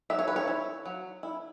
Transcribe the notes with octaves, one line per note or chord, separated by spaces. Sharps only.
F#3 E5
C#5
B4
C#5
E4
F#3
E4